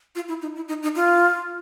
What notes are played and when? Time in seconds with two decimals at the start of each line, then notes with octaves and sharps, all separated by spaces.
0.15 F4
0.28 E4
0.42 D#4
0.56 E4
0.68 D#4
0.83 D#4
0.96 F4